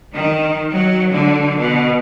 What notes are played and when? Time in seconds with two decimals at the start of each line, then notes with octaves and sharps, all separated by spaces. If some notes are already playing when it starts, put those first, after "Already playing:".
0.14 D#3
0.70 F#3
1.12 D3
1.59 B2